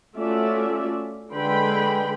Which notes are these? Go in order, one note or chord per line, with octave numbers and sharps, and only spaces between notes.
A3 C#4 F4 F#4 D5 E5
D3 G#3 B4 G5 B5 C6